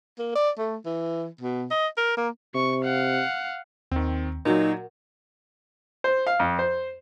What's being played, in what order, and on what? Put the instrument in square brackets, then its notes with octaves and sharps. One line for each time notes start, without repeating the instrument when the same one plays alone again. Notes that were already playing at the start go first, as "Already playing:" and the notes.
[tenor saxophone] A#3
D5
A3
E3
B2
D#5
A#4
A#3
[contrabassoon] C3 [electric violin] C#6
[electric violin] F5 F#5
[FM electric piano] D#2 [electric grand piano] D#3 C4
[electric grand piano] A#2 F#3 [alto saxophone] D#4 [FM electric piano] F#4 A#4
[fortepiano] C5
F5
F2
C5